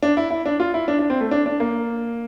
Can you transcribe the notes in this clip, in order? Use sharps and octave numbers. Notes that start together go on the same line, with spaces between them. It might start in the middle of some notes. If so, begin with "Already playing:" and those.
D4
E4
E4
D4
F4
E4
D4
D4
C4
A3
D4
D4
A#3